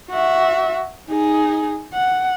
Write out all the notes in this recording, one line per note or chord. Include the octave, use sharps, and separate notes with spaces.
F#4 E5
D#4 G#4
F#5